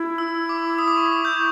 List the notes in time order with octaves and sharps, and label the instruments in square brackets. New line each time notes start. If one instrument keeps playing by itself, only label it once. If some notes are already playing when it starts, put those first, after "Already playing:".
Already playing: [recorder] E4
[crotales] E6
D6
D#6
D6
C#6
D6
G6